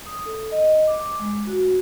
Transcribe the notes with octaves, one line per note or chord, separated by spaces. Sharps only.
D#6
A4
D#5
D6
D6
G#3
F#4